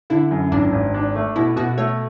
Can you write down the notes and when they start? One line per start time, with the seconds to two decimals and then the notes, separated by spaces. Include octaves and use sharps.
0.10 D3 E4
0.31 F#2
0.51 G#1 D4
0.72 G#1
0.94 D4
1.15 A3
1.36 B2 E4
1.56 B2 F#4
1.78 A3 C#5